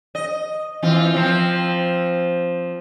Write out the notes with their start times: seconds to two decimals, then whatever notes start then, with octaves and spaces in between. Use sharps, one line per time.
0.15 D#5
0.83 E3 C4 F4
1.14 F3 C4